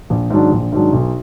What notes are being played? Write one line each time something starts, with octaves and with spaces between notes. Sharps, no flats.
A#1
G#2 D#3 F#3 D4
A#1
G#2 D#3 F#3 D4
B1